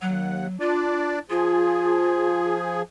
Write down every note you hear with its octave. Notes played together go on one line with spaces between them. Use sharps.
D#2 F#3 F#5
D4 F4 D5
F3 F4 G#4